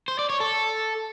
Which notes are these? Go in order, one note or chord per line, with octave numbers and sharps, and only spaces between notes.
C5
D5
C#5
A4